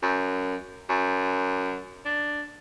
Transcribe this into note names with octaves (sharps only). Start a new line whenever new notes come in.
F#2
F#2
D4